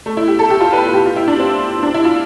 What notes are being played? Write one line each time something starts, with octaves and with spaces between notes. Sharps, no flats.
A3
E4
G4
A4
G4
F4
B4
B4
G4
F4
E4
D4
C4
D4
E4
F4